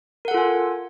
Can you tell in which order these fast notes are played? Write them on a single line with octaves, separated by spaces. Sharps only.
A#4 F#5 A4 F4 G#5